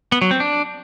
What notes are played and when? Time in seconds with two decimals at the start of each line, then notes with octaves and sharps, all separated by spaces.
0.12 B3
0.22 F#3
0.31 C4
0.40 D4